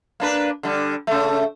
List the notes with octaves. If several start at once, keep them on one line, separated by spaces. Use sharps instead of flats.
A#3 D4 B4
D3 G3
C#3 A3